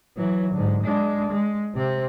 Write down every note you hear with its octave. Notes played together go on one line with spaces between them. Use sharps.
E3 F#3
G#2 D3
G#3 D4
G#3
C3 C4